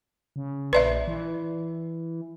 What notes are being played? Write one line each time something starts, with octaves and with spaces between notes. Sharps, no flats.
C#3
A#1 B4 D5 E5
E3